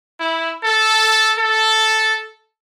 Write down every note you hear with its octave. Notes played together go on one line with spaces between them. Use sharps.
E4
A4
A4